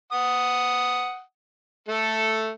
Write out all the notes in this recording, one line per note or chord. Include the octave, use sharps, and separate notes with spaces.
F#5 D#6
A3 A4